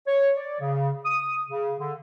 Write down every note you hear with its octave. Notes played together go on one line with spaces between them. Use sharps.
C#5
D5
C#3
D#6
C#3
D3